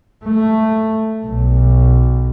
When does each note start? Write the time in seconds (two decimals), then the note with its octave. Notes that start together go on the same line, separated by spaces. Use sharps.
0.24 A3
1.27 B1